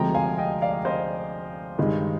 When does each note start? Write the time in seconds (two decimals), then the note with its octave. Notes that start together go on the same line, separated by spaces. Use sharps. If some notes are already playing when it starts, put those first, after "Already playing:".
Already playing: D2 C3 F3 G#3 G5 A#5
0.15 F5 G#5
0.38 D#5 G5
0.61 D5 F5
0.85 C5 D#5
1.78 G2 D#3 G#3